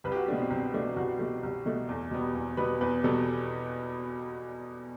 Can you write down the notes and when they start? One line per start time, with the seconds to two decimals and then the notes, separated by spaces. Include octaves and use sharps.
0.04 C2 B4
0.12 G4
0.16 F#4
0.28 B2 A3 D4
0.39 C4
0.50 C2 C4
0.74 B2 A3 D4
0.96 C2 F#4
1.19 B2 A3 G4
1.43 C2
1.66 B2 A3
1.89 E2
2.11 B2 G3 B3
2.35 E2
2.57 B2 G3 B3 B4
2.81 E2 B4
3.03 B2 G3 B3 A4